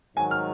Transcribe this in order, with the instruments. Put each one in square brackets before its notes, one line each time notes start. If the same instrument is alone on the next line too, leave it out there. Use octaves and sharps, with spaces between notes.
[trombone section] G#2 D#3 F#3 [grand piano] G#5
[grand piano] F6